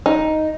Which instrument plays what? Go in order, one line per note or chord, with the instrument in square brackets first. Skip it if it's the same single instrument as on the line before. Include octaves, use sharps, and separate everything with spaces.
[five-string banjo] D#4